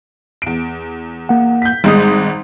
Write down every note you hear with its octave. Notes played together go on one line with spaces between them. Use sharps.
E2 D7
A#3 F#5
G6 B6
G#1 G3 G#3 D#6